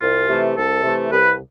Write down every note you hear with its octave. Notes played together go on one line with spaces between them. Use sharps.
C2 F4
C3 E3 A3
C2 A4
C3 E3 A3
C2 B4